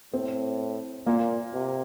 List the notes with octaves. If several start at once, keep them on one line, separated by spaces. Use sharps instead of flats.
A2 C4
A#2 A#3
C3